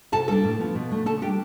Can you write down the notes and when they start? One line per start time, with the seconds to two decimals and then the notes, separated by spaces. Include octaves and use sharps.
0.12 C3 A4 A5
0.28 G3 D4 A4 A5
0.44 A2
0.59 F3 B3
0.75 B2
0.91 A3 D4
1.06 D3 A4 A5
1.22 G3 D4 G4 G5